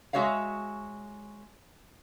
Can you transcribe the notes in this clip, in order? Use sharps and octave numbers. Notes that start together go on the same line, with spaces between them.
G#3 F#4 C#5 E5 F5